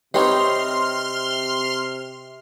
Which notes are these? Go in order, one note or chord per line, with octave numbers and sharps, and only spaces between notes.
C3 C4 D#4 G4 B4 C#5 C6 F6